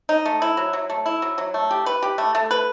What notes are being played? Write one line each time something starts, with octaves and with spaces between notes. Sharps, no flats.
D#4
A3
E4
F#3
F#3
A3
E4
F#3
F#3
A3
G4
B4
G4
A3
A3
B4